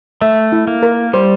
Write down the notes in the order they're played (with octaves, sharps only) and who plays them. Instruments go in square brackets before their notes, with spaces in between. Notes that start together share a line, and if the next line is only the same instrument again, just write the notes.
[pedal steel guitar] A3 [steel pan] E5
[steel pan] E4
[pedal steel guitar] A#3
[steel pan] A#4
[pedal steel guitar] G3 [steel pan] C5